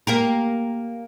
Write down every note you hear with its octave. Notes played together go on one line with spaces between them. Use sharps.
A#3 G4 A#4